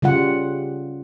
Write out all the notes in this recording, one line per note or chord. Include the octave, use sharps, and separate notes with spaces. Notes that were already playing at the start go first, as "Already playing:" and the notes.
C#3 G3 F4 F#5